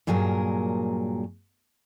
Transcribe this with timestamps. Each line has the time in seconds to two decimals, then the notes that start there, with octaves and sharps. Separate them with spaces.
0.07 G2 A#2 F#3 G#4 A#4